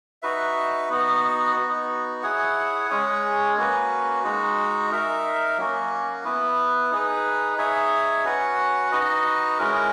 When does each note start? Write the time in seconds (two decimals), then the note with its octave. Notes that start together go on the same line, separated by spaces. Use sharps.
0.22 D#4 F#4 B4 E5
0.89 B3 D#4 F#4
1.56 B3 D#4 F#4
2.23 E4 G#4 C#5 F#5
2.90 G#3 C#4 G#4 C#5
3.57 A#3 C#4 F#4 B4
4.24 G#3 D#4 F#4
4.90 D#4 A#4 E5
5.57 F#3 A#3 C#4 F#4
6.24 B3 E4 B4
6.91 D#4 G#4 B4
7.58 D#4 G#4 C#5 E5
8.24 C#4 F#4 B4 F#5
8.91 D#4 F#4 B4 D#5
9.58 G#3 C#4 E4 A#4